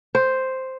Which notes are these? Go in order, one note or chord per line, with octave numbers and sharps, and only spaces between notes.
C5